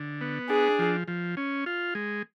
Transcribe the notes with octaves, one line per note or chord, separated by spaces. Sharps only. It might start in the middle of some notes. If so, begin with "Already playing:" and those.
Already playing: D3
B3
D4 G#4
F3
F3
C#4
F4
G#3